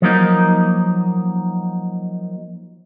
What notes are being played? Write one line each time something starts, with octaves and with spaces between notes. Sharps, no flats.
F3 F#3 A#3 D#4